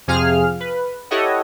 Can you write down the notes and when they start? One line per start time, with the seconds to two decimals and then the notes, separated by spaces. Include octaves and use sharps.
0.08 F2 C3 F3 G#4 F5 F6
0.60 B4
1.11 E4 G4 A4 C#5 D#5 F#5